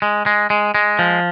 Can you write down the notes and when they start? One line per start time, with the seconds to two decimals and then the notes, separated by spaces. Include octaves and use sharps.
0.02 G#3
0.26 G#3
0.50 G#3
0.75 G#3
0.99 F3